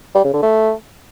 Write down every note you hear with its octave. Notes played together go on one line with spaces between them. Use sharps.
G3
C#3
D3
A3